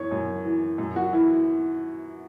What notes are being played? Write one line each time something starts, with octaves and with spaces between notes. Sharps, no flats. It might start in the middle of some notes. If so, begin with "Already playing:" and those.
Already playing: F#2 E3 C#5
F#2
E3
F#2
F#4
E3 E4